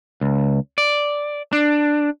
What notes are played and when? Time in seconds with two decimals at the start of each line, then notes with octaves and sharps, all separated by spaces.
0.21 C#2
0.78 D5
1.53 D4